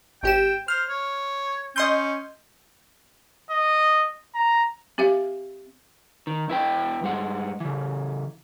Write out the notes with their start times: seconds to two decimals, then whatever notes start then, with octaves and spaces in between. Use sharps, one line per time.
0.23 G#1 G4 G5 E7
0.68 C5 F6
0.89 C#5
1.76 C#4 D#5 C6 G6
3.50 D#5
4.35 A#5
4.98 C4 G4 E5 F5
6.27 D#3
6.48 E2 E4 B4 G5
7.02 G2 G#3 F#5
7.60 C#3 E3